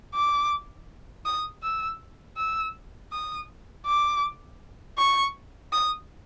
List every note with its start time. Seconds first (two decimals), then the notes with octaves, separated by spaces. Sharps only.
0.14 D6
1.26 D#6
1.63 E6
2.37 E6
3.12 D#6
3.86 D6
4.98 C#6
5.73 D#6